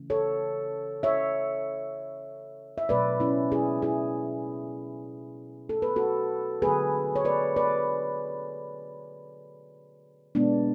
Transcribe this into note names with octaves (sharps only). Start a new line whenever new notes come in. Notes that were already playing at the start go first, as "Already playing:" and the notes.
Already playing: C#3 E3 A3
A4 C#5
C#5 E5
E5
B2 F#3 A3 B4 D5
C#4 E4
E4 G#4
E4 G#4
A4
B4
F#4 A4
D3 F#3 A3 G#4 B4
C#5
B4 D5
B4 D5
B2 G#3 B3 D4